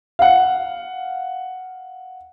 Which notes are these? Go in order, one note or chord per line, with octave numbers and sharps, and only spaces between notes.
F5 F#5